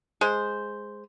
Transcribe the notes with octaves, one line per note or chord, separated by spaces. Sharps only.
G#3 C5